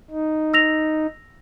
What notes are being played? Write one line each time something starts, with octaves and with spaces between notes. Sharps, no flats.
D#4
E6 A#6 F7